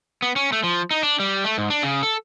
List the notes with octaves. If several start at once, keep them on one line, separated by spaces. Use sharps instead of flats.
B3
C#4
A3
F3
D#4
D4
G3
A3
G#2
D4
C#3
A4